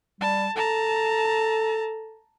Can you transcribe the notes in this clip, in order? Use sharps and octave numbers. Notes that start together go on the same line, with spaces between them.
G3 A5
A4 A5 A#5